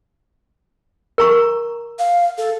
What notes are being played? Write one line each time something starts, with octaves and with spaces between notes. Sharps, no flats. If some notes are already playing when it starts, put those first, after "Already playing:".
A#4 A#5 C#6
F5
A4